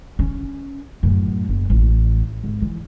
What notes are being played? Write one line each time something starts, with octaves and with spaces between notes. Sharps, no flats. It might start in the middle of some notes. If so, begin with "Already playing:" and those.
C#4
F#2 A2
F#1
A1
G#1
E3